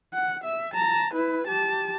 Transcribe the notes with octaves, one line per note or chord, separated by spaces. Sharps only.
F#5
E5
A5 A#5
E4 B4
G4 A5